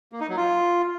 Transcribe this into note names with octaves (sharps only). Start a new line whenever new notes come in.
A#3
D#4
F#3
F4